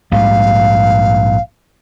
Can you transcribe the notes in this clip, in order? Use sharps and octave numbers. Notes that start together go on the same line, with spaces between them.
A#1 G#2 G3 F5